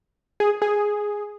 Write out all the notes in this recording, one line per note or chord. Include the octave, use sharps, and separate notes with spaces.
G#4
G#4